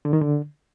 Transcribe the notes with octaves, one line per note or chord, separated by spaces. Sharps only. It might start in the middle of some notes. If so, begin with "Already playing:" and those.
D3
D#3
D3